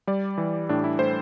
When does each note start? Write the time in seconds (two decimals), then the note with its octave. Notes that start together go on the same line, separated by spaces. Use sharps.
0.07 G3 D5
0.38 E3
0.69 A2 D4
0.84 E4
0.99 A2 C5